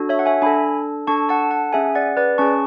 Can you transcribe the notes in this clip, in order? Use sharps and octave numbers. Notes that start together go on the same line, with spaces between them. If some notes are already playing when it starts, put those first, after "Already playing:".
Already playing: D4 F#4 A4
C#5 E5
F#5
E5 G#5
D4 A4 G#5 B5
D4 A4 A5 C#6
F#5 A5
F#5 A5
C#4 G#4 E5 G#5
D5 F#5
B4 D5
C#4 G#4 A5 C#6